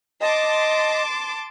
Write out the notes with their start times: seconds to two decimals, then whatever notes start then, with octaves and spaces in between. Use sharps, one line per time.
0.21 D#5 A5 C6 D6